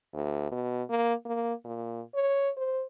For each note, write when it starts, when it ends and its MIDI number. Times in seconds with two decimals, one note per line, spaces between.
0.13 0.49 38
0.51 0.83 47
0.90 1.14 58
1.25 1.53 58
1.65 2.01 46
2.15 2.50 73
2.56 2.83 72